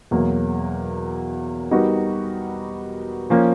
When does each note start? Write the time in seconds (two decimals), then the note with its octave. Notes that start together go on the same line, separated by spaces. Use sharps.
0.11 E2 B2 F#3 A#3
1.71 G3 B3 D#4 F#4 A#4
3.30 F3 A#3 C#4